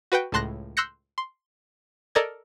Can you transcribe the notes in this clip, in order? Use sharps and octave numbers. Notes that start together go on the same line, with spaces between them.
F#4 B4 F#5 G5
C#2 A2 A5 C6 F#6 A#6
C6 E6 F#6 G6 A#6 C#7
C6
A4 A#4 D5 D#5 G#6